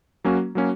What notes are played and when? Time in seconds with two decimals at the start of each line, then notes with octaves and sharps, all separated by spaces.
0.24 F#3 A#3 C#4 F#4
0.55 F#3 A#3 C#4 F#4